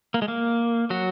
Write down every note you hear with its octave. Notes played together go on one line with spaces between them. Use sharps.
A#3
G#3
A#3
F#3 F#4